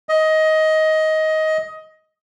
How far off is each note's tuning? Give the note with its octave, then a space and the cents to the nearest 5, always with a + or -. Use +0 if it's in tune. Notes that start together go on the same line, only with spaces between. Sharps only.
D#5 +15